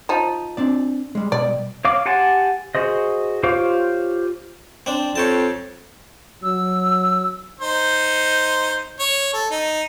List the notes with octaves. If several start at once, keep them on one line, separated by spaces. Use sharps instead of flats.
F3 D#4
C4 D4 D5
G3 G#3
B2 G3 D5
C#5 F5 D6
G4 F#5 G#5 A5 C6
F#4 G#4 C5 D#5
F4 G4 C5 C#5 F5
C4 D4
F2 C#5 G5 A5
F#3 E6
D#4 C5
C#5
A4
D#4